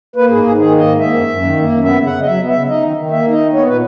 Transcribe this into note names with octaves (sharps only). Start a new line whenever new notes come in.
A#3 B4
G#2 G#4
G#2 G#4
D#3 G#4
A#3
D#5
G#2
A#3 E5
F#2
F#2
D#3
A#3
F#2
B3 E5
C#3
F#5
C#3
D#5
F#3 E5
B3
E5
C#3
D#4 D#5
D#3
D#3
A#3 E5
D#4
D#5
D#3
B3 C#5
A#2 B4